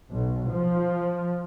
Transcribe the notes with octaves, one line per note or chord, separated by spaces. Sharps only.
B1
F3